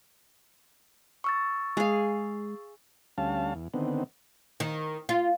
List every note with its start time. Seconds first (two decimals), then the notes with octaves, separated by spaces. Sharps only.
1.24 C#6 E6 A6
1.77 G#3 G#4 F5
3.18 D2 G3 C#4 F5 A5
3.55 E2
3.74 D3 D#3 B3 C4
4.60 D#3
5.09 F4